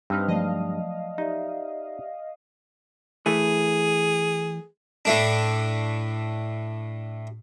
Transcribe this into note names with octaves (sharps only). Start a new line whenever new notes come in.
G2 C4 D#4 B4 E6 F6
F3 F#3 A3 D5 D#5 F5 A5
D#4 G4 D5 E5
E3 A3 G#4
A2 A3 D4